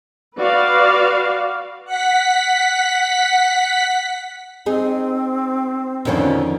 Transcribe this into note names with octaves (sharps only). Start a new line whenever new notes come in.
F#4 B4 D5 F5
F#5 B6
C4 D#4 G#4
F2 B2 D3 D#3 F3 C#4